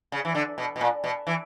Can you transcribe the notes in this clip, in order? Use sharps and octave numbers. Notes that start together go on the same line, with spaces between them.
C#3
E3
D3
B2
B2
A#2
B2
E3